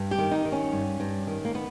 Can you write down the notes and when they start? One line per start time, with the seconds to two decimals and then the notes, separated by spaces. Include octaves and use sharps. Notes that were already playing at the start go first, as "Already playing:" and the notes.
Already playing: G2
0.11 G4
0.19 D#3
0.31 D#4
0.45 D#3
0.52 C#4
0.72 G2
1.00 G2
1.27 D#3
1.45 A#3
1.55 B3